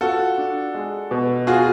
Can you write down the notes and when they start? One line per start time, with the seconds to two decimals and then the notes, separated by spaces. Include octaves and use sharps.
0.01 F4 F#4 A4
0.38 D4
0.75 G#3
1.11 B2
1.47 F4 F#4 G#4